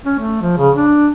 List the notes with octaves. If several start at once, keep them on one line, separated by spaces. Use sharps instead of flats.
C#4
A3
F3
C#3
D4